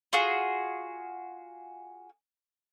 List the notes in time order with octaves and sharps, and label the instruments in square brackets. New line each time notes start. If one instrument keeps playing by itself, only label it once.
[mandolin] F4 F#4 G#4